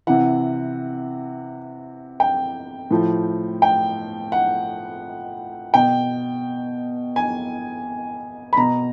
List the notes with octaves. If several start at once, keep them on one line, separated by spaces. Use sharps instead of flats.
C3 E3 F#5
G5
A2 F3
G5
F#5
B2 G5
G#5
B5
B2 A#5